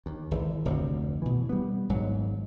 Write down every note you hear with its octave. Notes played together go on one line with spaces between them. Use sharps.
D#2
G#1 G#2 E3
F1 D2 C3
B2 E3
G3 B3
G#1 G#2 F#3